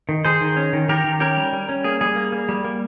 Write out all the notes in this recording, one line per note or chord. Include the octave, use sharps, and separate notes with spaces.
D#3
D#3 G#4 C5
D#3
C#4
D#3
D#3 G4 A#4
D#3
C#4 G4 A#4
G3
G3
C#4
A#3 G#4
G3 G#4
A#3
A#3
G3
A#3